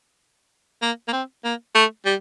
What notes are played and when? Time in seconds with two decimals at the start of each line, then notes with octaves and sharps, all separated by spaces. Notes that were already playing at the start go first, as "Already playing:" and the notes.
0.82 A#3
1.08 A#3
1.13 C4
1.45 A#3
1.75 A3
2.06 G3